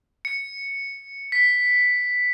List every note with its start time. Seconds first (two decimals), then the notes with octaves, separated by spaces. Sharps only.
0.25 C#7
1.32 B6